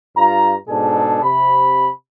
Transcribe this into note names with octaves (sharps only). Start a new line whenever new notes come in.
G2 F4 A#5
G#2 B2 D4 G#4 A4
C3 B5